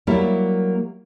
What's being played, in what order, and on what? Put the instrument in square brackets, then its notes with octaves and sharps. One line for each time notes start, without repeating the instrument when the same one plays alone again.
[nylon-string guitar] F#3 G3 A#3 E4